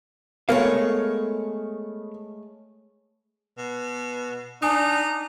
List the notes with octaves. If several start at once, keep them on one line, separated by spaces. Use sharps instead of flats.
G#3 A3 B3 A4 A#4 C#5 F5
B2
D4 D#4 G#5 D#6